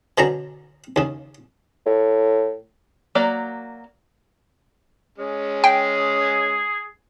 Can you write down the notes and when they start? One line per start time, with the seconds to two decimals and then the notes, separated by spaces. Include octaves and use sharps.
0.18 B2 D3 C#4 A#5
0.96 D#2 C#3
1.86 A2
3.15 F#3 A#3 D5
5.18 G#3 C#4
5.64 G#4 G5